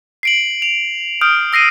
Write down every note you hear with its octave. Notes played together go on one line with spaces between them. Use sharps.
C7 D7 F#7
F7
D#6 F6 G6 D7
E6 A#6 C7 D#7